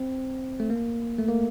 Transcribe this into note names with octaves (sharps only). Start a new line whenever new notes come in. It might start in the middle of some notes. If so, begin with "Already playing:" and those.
Already playing: C4
A3
A#3
A3
A#3